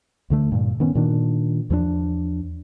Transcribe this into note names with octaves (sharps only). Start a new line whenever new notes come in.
D2 D3 A3
G2 A#2
D#3 B3 C#4
A#2 D#3 D4
E2 F3 A3 D4